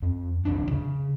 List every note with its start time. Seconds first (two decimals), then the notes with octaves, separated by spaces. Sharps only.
0.02 F2
0.45 D#1 C2 F2 D4
0.71 C#3